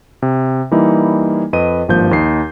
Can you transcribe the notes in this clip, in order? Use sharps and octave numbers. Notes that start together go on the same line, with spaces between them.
C3
E3 G3 A#3 D#4 E4
F2 B4 D#5 D#7
G#1 G2 F3 A#3 G6
D#2 D#4 C7